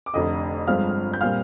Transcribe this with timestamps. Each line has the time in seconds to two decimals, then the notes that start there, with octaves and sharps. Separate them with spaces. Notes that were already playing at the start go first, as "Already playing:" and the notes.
0.06 D6
0.14 F1 F2 D3 D#5 D#6
0.67 G1 G2 F3 G#3 C4 F5 F6
1.13 G6
1.21 A#2 G3 C4 F5 F6